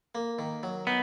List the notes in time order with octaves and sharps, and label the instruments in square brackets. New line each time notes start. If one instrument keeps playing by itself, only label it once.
[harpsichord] A#3
D#3
F#3
[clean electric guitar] B3 [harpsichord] D#4